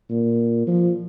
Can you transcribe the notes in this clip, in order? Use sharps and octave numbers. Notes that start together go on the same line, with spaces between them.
A#2
F3